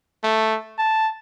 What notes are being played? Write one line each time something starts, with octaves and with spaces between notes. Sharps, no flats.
A3
A5